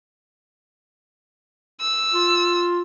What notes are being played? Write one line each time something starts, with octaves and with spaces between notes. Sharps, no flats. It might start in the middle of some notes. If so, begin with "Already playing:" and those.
E6
F4